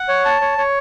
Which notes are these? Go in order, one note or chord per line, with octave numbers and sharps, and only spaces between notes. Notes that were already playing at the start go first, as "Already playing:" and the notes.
Already playing: F#5
C#5
A5
C#5
C#5